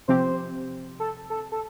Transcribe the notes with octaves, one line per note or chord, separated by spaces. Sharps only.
C3 F3 C4 G4 C5
A4
A4
A4